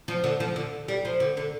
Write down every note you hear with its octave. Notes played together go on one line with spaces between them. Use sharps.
F3
D3
F3
D3
G3
F3
D3
D3